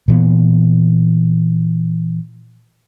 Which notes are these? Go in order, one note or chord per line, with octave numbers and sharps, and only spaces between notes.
A#2 E3 B3